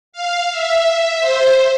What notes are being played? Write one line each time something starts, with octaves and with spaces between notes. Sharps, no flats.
F5
E5
C5